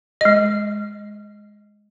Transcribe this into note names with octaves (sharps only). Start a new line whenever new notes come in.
G#3 D#5